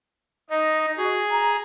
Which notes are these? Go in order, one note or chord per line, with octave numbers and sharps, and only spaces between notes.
D#4 D#5
F#4 G#4
A#5